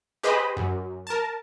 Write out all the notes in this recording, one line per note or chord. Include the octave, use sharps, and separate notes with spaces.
G4 G#4 B4 C5 D#5 B5
F#2
A#4 A5